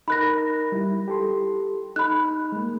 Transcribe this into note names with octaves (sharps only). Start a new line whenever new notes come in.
D#4 A#4 B5 F#6 A#6
G3 E4
G4 A4 C6
D#4 B5 F#6
G#3 A#3